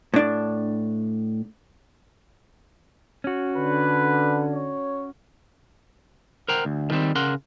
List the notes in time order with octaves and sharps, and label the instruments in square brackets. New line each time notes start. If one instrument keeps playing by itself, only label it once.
[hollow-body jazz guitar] A2 D4
[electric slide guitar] C#4 F#4
[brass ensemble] D3 [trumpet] B4
[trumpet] C#5
[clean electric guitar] A#4 C5 F#5 G5 A#5
D2
A2 D#3 G3 C4
C#3 A#4 F#5 C6